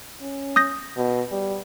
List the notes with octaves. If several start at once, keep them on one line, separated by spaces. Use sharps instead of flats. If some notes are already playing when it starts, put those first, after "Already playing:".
C#4
D#6 G6 A#6
B2
G3